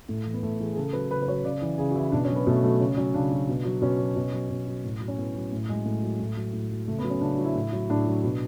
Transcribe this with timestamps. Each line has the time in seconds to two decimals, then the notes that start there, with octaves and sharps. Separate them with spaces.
0.09 A2 A3
0.25 E3
0.33 B3
0.43 A2 A3
0.60 E3 G#4
0.73 G#4
0.77 C#3 A4
0.93 F#3 B4
1.11 C#3 B4
1.22 B4
1.28 F#3 C#5
1.44 C#3 D5
1.62 E3
1.78 C#3 G#4
1.91 F#4
1.95 E3 E4
2.12 B2 D4
2.24 C#4
2.30 F#3
2.35 B3
2.46 B2 A3
2.63 F#3 A3
2.80 C#3 C#4
2.97 F#3 C#4
3.14 C#3 D4
3.31 F#3
3.49 B2
3.65 F#3
3.82 B2 C#4
3.99 F#3
4.16 B2
4.33 F#3
4.50 B2
4.67 F#3
4.84 A2
5.00 F#3
5.08 C#4
5.18 A2 B3
5.35 F#3
5.52 A2 A3
5.69 F#3 G#3
5.85 A2 A3
6.03 F#3
6.19 A2 A3
6.37 F#3
6.53 A2
6.71 F#3
6.87 C#3 A3
6.99 B3
7.04 F#3
7.10 C#4
7.21 C#3 D4
7.33 D4
7.39 F#3
7.45 E4
7.55 A2
7.72 F#3
7.90 A2 D4
8.07 F#3
8.24 B2